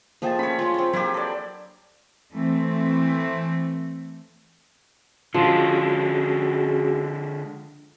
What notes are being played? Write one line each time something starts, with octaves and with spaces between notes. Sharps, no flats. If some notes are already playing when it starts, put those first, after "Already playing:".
F3 A3 A#3 G#4 G5 A6
C#4 C#5 B5
G#3 C#4 F4 C6
C4 D4
F#3 A#3 D4 E4 G4 G#4
A4 D5
E3 A3 C4
D3 F3 G#3 C#4 F#4 G#4